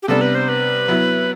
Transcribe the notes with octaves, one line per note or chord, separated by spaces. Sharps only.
G4
C3 G3 B3 D4 A4
B4
C5
B4
F#3 B3 E4